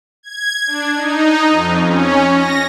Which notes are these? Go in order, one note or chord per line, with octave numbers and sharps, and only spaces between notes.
G#6
D4
D#4
F2
C#4
A#6